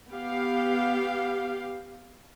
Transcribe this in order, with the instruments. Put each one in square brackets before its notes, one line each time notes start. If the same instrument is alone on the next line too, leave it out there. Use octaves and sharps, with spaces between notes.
[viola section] B3 G4 F5